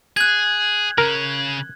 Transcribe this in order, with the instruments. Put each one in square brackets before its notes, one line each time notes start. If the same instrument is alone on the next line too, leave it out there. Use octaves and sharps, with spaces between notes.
[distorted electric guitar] G#4 [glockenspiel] F#6 G#6
[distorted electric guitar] C#3 C#4 [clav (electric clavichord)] A#4